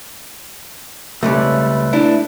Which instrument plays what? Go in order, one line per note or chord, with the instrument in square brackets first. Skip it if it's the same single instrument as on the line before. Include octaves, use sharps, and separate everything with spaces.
[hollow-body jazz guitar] C#2 C#3 G3 [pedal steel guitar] A3 B4
[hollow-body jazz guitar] D4 E4